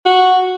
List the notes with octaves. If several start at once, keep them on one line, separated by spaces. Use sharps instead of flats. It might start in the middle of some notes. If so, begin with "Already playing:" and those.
F#4